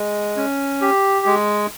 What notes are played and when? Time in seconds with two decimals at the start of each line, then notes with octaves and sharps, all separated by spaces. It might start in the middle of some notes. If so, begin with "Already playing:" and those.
Already playing: G#3
0.36 C#4
0.81 G4
1.26 G#3